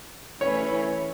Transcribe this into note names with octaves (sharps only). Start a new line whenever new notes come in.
E3 A3 C#4 E4 C#5